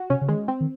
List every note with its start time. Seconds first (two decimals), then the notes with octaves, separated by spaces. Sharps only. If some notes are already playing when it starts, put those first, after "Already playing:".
Already playing: F#4
0.10 C3 C#4
0.21 C#3
0.28 D#3 G#3
0.48 C4
0.61 D#3